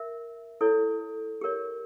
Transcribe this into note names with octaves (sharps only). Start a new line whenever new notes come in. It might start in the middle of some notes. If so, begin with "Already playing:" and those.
Already playing: A#4 E5
E4 A4 C#5
G4 A#4 C#5